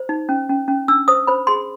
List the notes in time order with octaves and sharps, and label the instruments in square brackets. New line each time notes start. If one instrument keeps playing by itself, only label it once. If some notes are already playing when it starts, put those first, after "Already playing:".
Already playing: [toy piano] C5
D#4
C#4
C#4
C#4
D4 E6
C5 D#6
C5 B5
G#4 C6